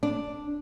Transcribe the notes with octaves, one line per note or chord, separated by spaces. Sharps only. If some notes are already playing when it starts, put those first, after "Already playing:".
D4